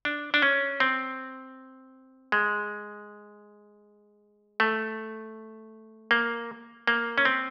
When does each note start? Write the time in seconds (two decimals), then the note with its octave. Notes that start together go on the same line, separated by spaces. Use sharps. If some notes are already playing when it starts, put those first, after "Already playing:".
0.05 D4
0.34 D4
0.42 C#4
0.80 C4
2.32 G#3
4.60 A3
6.11 A#3
6.88 A#3
7.18 C#4
7.25 C4